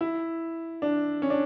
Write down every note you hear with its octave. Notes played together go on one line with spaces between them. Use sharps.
E4
D4
C#4
D4